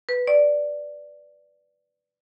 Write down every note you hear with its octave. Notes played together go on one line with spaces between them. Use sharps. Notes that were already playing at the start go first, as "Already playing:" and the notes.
B4
D5